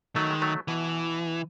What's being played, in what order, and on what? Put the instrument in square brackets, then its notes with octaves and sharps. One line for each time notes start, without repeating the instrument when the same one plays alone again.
[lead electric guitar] D#3 [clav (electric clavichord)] F#3 A3
[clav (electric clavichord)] G#3
F#3 A3
[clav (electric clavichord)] B2 [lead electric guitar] E3